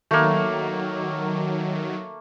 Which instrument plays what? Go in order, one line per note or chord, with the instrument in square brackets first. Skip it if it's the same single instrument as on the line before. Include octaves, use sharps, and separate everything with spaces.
[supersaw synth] D#3 F#3 [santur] A3 A#3